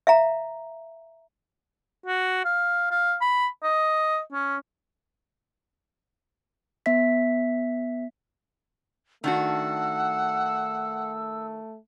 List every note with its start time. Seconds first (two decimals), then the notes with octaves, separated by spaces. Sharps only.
0.07 E5 F5 A#5
2.06 F#4
2.45 F5
2.91 F5
3.21 B5
3.63 D#5
4.32 C#4
6.86 B3 E5 B6
9.24 D#3 A3 D4 F#4 F#5 E6